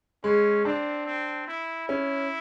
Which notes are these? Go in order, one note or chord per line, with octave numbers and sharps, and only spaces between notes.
G#3 C#4
C4 D4
C4
E4
C#4 E4